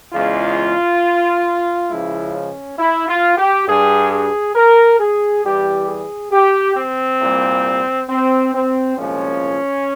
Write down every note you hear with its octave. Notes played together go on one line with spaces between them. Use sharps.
E2 C#3 E3 G#3 F4
C#2 C#3 F3 G#3 E4
C#4
E4
F4
G4
G2 G3 G#4
G#4
A#4
G#4
E2 E3 G3 G4
G#4
G4
C4
C2 A#2 G3
C4
C4
C2 A#2 F3 G#3 C#4